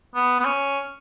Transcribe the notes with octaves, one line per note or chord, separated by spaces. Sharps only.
B3
B3
C#4